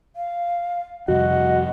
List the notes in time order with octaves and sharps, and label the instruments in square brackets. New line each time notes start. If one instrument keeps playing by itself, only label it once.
[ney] F5
[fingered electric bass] F2 C3 G3 [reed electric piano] F#4 [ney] D#5 [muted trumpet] F#5